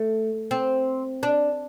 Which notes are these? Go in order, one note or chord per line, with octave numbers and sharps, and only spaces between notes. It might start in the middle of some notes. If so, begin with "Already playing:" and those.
Already playing: A3
C4
D4